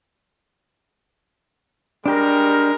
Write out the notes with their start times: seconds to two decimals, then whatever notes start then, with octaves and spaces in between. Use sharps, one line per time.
2.06 G3 G#3 D4 G4 A#4